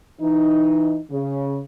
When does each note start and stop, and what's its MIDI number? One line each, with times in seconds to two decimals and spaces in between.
0.21 0.98 52
0.21 0.98 63
1.11 1.59 49